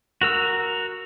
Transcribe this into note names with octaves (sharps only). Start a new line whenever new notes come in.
F#4 A#4 E6